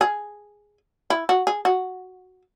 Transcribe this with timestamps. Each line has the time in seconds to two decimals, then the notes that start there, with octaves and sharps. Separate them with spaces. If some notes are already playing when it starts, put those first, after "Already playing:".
0.01 G#4
1.10 E4
1.29 F#4
1.47 G#4
1.65 F#4